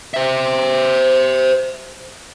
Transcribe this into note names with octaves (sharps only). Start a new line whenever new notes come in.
C5 E5